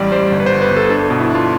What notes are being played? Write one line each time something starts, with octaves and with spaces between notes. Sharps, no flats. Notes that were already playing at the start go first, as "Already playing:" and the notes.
Already playing: A1 G3 D5
G3 C5
G1 D5
B4
C5
G1
B4
G1
A4
D4 A4
B2
E4
D4 F4